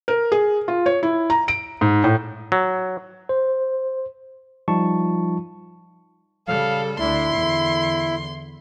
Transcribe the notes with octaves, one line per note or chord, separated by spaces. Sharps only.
A#4
G#4
F4
C#5
E4
A#5
D7
G#2
A2
F#3
C5
F3 G3 D#4 F4 A5 C#6
C#3 G3 A4 F5
D2 D4 E4 C6
E2 D3